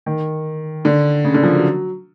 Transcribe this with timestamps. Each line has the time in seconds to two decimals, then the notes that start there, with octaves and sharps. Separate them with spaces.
0.06 D#3
0.85 D3
1.24 C#3
1.34 D3
1.43 F3
1.53 F#3